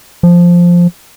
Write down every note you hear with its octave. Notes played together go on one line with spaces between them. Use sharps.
F3